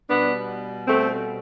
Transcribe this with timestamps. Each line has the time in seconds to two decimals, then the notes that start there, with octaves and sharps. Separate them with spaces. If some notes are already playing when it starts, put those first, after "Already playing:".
0.09 B2 G3 B3 D4
0.87 A3 C4